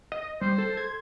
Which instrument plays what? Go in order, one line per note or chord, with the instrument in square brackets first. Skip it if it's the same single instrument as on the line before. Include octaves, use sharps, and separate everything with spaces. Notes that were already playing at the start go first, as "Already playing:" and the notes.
[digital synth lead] D#5
[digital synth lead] G3 [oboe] C5
[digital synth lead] A4
G#6